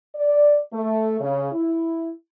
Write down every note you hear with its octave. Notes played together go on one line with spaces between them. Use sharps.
D5
A3
C#3
E4